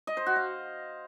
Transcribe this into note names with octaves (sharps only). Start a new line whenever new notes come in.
D#5
C5
F#4
F5